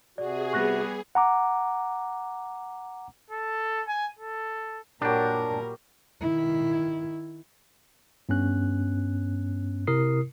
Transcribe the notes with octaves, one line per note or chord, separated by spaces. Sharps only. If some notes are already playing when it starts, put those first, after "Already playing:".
C3 F#4 G#4 D5
G3 B3 C#6 F#6 A#6
F#5 A#5 D6
A4
G#5
A4
A#2 F#3 G3 D4 A#4 G5
D#3 E4
G2 B3 C#4 F#6
C3 E4 A#4 D#6 C7